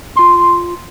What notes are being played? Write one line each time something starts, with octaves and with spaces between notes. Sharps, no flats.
F4 C6